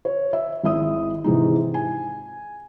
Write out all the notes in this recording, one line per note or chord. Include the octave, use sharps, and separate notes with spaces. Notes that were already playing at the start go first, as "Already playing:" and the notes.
C#5
E5
G#1 E4 E5 D#6
G#2 C3 E3 G#3 D#4
G#5